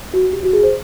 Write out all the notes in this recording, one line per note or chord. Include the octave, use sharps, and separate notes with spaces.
F#4
G4
F#4
G#4
C5